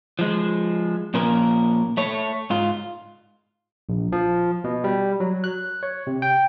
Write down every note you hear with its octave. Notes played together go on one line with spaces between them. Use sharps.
F3 G#3
A#2 F3 A#3 C#4 A#4
A3 C#5
G#2 F4
A#1
F3
B2
G3
F#3
F#6
C#5
C3
G5